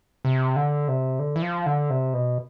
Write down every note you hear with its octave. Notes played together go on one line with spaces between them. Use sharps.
C3
D3
C3
D3
E3
F3
D3
C3
B2